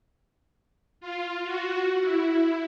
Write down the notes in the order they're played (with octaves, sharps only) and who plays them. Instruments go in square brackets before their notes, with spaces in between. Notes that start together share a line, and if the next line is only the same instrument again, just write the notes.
[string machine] F4
F#4
E4